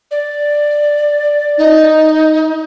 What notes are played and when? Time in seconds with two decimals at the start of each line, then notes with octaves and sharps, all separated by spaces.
0.11 D5
1.58 D#4